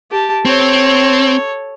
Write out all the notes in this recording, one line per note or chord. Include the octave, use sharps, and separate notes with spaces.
G4 A5
C4 A4 C#5